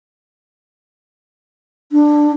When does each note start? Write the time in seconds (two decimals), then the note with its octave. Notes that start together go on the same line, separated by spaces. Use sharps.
1.92 D4